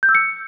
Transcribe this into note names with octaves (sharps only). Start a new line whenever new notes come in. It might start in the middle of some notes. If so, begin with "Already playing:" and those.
G6
E6
C#7